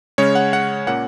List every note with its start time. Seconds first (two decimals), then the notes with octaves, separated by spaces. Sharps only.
0.18 C#3 G#3 C#4 C#5
0.35 F#5
0.53 F#5
0.87 A#2 A#3 C#4 F#5